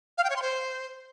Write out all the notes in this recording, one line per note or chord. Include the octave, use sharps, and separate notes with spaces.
F5
G5
C#5
C6
C5